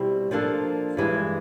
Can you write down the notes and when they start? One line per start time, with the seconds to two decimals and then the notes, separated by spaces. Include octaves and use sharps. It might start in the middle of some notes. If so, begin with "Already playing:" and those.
Already playing: B2 G3 C4 E4
0.31 F3 A#3 D4 F4 A4
0.97 G2 E3 G#3